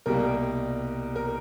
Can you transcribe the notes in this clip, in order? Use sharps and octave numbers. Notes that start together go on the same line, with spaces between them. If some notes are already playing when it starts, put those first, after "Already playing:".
C2 B2 G3 A#3 A#4
A#4